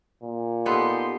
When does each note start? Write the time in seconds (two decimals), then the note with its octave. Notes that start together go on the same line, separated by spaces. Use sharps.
0.23 A#2
0.66 B3 D#4 G4 A4 C6